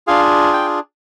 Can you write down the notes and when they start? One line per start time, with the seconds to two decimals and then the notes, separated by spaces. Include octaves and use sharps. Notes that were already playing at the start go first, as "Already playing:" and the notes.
0.07 D4 F4 G#4 F5
0.53 G5